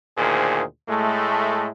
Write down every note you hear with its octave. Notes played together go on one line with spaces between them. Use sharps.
D2 A#2 D#3 G#4 C5
A2 G#3 A3